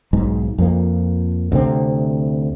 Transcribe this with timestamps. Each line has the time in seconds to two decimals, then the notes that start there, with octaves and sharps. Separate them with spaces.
0.13 B1 G#2
0.58 F2 F3 A#3
1.52 D2 C3 C4